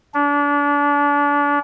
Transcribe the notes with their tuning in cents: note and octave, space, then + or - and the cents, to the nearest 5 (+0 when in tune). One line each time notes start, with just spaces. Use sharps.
D4 -30